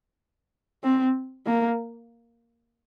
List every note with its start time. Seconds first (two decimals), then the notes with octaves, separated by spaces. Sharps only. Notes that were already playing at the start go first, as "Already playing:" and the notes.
0.84 C4
1.46 A#3